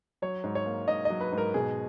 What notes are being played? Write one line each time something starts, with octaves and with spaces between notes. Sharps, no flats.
F#3 C#5
G#2
C#5
A#3
G#2 D#5
D#5
F#3
B4
G#2
A#4
B2 G#4